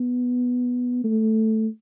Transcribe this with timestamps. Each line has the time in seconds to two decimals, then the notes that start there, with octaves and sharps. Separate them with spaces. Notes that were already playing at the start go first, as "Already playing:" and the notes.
Already playing: B3
1.04 A3